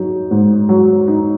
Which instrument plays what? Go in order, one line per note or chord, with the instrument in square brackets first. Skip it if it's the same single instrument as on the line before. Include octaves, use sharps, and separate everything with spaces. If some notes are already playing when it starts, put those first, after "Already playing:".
Already playing: [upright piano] F#3 D#4
G#2
F#3
D#4